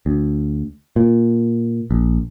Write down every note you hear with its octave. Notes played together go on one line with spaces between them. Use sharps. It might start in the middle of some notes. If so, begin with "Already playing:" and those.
D2
A#2
A#1